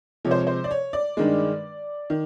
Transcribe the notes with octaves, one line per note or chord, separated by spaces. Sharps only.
C3 F3 G#3 C#5
C5
C#5
C5
D5
C#5
D5
G2 D#3 G#3
D#3